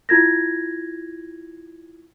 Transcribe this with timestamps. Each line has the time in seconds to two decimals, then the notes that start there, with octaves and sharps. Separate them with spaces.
0.09 E4 F4 G#6 A#6